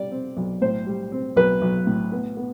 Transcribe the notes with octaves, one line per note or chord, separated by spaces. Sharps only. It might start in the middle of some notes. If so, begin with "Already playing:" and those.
Already playing: G3 D5
C4
B1
A2 C5
G3
C4
B1 B4
B1
A2
B3
B3